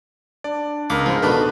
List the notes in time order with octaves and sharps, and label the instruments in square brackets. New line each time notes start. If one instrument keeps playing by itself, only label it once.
[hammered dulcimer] D4 [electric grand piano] D5
[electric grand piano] C#2 [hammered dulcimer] G#3 B3 A#4 [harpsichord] D6
[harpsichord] G#2 F3
[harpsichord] B2 D3 D#3 [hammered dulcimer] D4 [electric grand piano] B4 A5